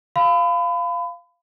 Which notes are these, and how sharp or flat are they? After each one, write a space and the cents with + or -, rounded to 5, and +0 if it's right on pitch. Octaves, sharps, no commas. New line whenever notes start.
F5 -5 B5 +30